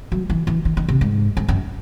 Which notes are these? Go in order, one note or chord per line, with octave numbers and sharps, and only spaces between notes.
F#3
E3
E3
D#3
D#3
C3
G#2
G#2
F#2